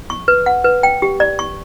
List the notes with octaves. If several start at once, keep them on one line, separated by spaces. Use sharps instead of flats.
C#6
B4
F#5
B4
G5
G4
D5
C#6